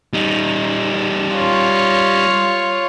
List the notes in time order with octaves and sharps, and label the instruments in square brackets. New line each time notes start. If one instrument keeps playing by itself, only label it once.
[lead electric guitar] G3 D#4
[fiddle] F4 C#5